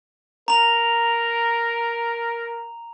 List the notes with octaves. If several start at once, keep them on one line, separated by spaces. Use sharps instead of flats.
A#4 A#5 F7